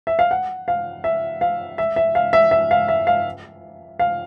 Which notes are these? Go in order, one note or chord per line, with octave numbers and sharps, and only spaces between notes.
E5
F5
F#5
F5
E5
F5
E5
E5
F5
E5
E5
F5
E5
F5
F5